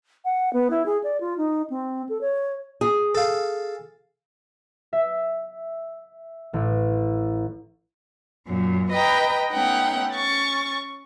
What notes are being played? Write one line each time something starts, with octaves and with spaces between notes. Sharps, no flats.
F#5
B3
E4
G#4
D5
F4
D#4
C4
A4
C#5
G#4
A4 F5
E5
A1
F#2 A#2
B4 D#5 G5 A#5
A3 B3 C#4 D#4 F#5 G5
C#4 C#6 A6